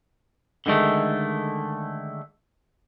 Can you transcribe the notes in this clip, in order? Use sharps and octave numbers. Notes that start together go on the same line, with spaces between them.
D3 D#3 G#3 A3